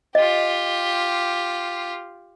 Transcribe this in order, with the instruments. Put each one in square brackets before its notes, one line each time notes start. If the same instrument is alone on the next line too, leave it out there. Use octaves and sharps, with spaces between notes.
[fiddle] F4 G4 [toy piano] D#5